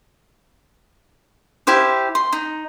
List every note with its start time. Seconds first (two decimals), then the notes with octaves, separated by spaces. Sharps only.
1.67 E4 G4 C5 F5
2.15 C6
2.33 D#4